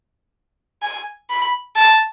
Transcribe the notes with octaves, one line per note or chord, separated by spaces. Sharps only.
G#5
B5
A5